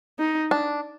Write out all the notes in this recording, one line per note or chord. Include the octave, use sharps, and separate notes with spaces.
D#4
D4